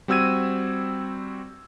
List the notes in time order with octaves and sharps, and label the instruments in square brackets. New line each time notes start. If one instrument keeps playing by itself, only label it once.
[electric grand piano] G3 C4 F#4 E6 G#6 D#7